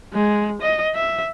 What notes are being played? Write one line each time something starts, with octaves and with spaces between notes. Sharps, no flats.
G#3
D#5
E5